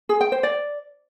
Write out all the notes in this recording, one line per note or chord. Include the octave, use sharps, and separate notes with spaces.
G#4
G5
C5
D5